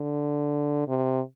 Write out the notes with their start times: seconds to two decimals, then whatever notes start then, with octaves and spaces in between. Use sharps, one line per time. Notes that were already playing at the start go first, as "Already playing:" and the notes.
Already playing: D3
0.88 C3